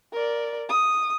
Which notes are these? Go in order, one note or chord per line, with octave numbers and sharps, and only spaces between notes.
A#4 D5
D#6